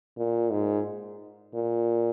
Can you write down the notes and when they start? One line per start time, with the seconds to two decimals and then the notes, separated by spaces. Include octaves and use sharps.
0.17 A#2
0.51 G#2
1.54 A#2